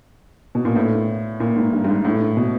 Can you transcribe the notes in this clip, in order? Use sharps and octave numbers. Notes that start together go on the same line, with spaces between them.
B2
A#2
A2
A#2
G#2
G2
G2
G#2
A2
B2